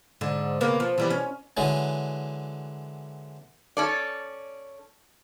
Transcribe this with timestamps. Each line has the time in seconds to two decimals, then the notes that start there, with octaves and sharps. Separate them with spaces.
0.21 G#2 D3
0.61 C#3 A#3 B3
0.80 F3
0.98 E3 G3 B3
1.10 C#4
1.57 D3 E3 F#3 G#3
3.77 C#4 A4 D5